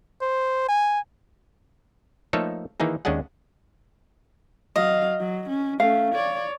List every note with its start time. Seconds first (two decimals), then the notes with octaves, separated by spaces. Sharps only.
0.21 C5
0.69 G#5
2.33 F3 A3 A#3 D#4 A4 C#5
2.80 D#3 E3 A#3 D#4 G#4
3.05 D#2 G#3 C#4 D4 G#4 F#5
4.76 F#3 D#5 F5
5.19 F#3
5.49 C#4
5.80 A3 C#4 F5
6.14 C#5 D5